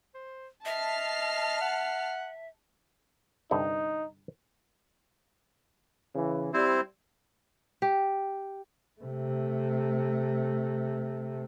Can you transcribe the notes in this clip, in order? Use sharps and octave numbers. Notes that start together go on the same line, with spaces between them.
C5
D#5 E5 A5 F6 C7
F#5
C2 G2 D3 D#4
C#3 E3
G3 C4 E4 C5
G4
C3 A3